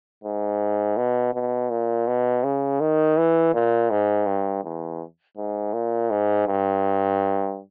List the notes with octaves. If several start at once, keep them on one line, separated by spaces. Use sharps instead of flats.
G#2
B2
B2
A#2
B2
C#3
D#3
E3
A#2
G#2
G2
E2
G#2
A#2
G#2
G2